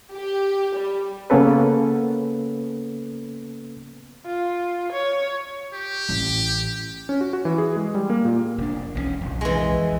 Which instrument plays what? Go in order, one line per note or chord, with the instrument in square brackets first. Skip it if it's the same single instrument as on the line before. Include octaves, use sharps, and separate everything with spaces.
[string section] G4
G3
[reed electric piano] C#3 A#3 B3 C#4 A4 B4
[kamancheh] F4
C#5
[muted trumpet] G4
[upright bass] A1 E4
[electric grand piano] C#4
F#4
F#4
E3
G#4
G#3
G3
A#3
A#2
[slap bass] F1 D4
[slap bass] E1 G2 C#4 [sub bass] B1
[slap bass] A#1 F2 C3
[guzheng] E3 G#3